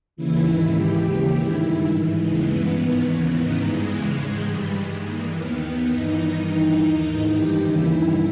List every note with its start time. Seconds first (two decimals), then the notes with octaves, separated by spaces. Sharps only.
0.16 D#2 C#3 E3 E4
0.45 G#2 D#3 E4
0.74 G#2 E3 G4
1.03 D#2 C#3 E3
1.31 G#2 D#3 E4
1.59 G2 D#3 E4
1.89 G#2 E3
2.17 D#2 C#3 E3 G#3
2.46 G2 E3 B3
2.75 G#2 D#3 B3
3.03 D#2 C#3 E3
3.32 G#2 D#3 B3
3.60 G2 E3 G#3
3.89 E2 C#3 E3
4.17 G#2 D#3
4.46 G2 E3 G3
4.75 G2 D#3 G#3
5.04 G2 E3 A#3
5.32 D#2 D#3 B3
5.61 D#2 D#3 B3
5.90 G2 E3 D#4
6.18 G2 D#3 D#4
6.47 G2 E3
6.76 D#2 D#3
7.05 G#2 E3
7.33 G2 D#3 G4
7.62 D#2 C#3 E3 E4
7.90 G2 D#3